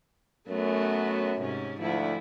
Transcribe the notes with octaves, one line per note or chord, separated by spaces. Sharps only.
F#2 A3 B3 F#4
G#2 C3 C#4
D2 F3 E4